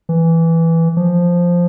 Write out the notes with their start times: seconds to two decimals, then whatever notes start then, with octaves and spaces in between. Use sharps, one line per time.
0.09 E3
0.97 F3